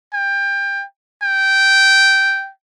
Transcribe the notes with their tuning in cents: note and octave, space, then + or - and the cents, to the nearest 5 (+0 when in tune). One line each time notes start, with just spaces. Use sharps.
G5 +25
G5 -10